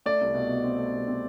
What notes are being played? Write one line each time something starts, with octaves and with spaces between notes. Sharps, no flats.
A3 D5
C2
B2
B2
C4
A3
C2
C4